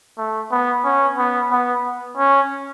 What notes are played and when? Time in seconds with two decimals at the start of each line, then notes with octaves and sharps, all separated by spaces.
0.18 A3
0.52 B3
0.85 C#4
1.18 B3
1.51 B3
2.18 C#4